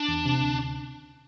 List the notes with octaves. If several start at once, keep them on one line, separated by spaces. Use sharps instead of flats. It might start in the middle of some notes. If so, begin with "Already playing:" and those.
Already playing: D4
E2
C3
D2